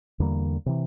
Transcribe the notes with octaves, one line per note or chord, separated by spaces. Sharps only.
E2 D3 G3 A#3
C3 E3